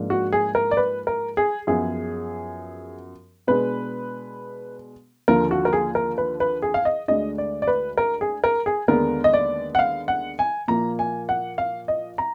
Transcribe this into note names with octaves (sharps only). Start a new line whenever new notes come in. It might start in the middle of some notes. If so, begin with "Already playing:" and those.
Already playing: G#2 F3 A#3 D4
F#4
G#4
A#4
D5
B4
A#4
G#4
F#2 F3 B3 G#4
B2 G#3 D4 B4
D#2 D3 F3 A#4
F#4
A#4
G#4
A#4
B4
B4
G#4
F5
D#5
D2 D3 G#3 D4 D#5
D5
D5
B4
A#4
G#4
A#4
G#4
D#2 D3 G#3 B3 D4 A#4
D#5
D5
F#5
F5
F#5
G#5
A#2 F3 A#3 A#5
G#5
F#5
F5
D#5
A#5